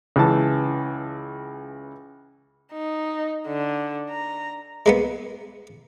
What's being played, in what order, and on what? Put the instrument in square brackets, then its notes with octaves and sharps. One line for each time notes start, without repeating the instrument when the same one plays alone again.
[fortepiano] C#2 E3 A5
[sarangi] D#4
D3
A#5
[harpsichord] G#3 A#3 B3